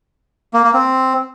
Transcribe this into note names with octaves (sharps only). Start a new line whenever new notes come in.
A#3
A#3
C4